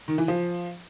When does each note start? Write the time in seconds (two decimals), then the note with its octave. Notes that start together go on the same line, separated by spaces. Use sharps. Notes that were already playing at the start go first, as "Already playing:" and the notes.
0.08 D#3
0.18 E3
0.28 F3